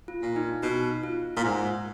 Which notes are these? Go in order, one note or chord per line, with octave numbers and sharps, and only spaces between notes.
F4
A#2
D#4
B2 D#4
F4
A#2
G#2